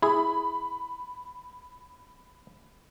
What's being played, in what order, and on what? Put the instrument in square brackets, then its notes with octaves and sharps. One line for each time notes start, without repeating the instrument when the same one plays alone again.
[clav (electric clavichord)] E4 G#4 [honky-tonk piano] B5